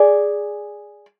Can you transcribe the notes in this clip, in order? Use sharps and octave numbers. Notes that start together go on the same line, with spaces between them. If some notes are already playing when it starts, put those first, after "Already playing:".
Already playing: G#4 D5